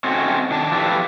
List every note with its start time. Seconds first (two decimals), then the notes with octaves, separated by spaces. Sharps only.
0.04 C4 C#4 D#4 F#4 A4
0.51 D#3 D4 A5
0.72 F3 E4 G4 A4 B4 D5